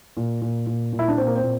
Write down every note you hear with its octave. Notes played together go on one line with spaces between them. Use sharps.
A#2
A#2
A#2
A#2
E4
D4
A#2 C4
A#3
C4
A#2